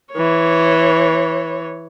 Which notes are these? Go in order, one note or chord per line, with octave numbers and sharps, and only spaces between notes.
E3 C#5